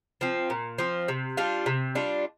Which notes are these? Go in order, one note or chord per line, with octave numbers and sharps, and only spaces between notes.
F3 C4
A#2
F3 C4
C3
G3 D4 F4
C3
G3 D4 F4